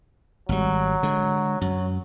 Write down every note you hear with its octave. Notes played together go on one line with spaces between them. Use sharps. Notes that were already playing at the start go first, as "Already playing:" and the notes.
G#1 F#3 G3
D3 G#3
F#2 F#3